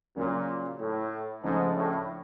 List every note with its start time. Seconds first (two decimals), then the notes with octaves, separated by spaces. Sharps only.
0.16 A#2 C#3 F#3 A#3 C#4
0.80 A2
1.43 G#2 C#3 F3 A3 D4
1.76 A2